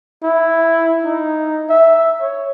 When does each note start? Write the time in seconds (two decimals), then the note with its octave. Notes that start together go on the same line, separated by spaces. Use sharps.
0.23 E4
1.03 D#4
1.69 E5
2.20 C#5